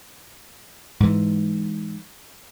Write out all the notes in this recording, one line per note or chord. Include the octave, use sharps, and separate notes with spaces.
G#2 E3